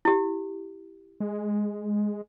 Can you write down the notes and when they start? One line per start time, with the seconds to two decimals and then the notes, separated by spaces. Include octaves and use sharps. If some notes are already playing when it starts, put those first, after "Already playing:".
0.05 E4 G4
1.20 G#3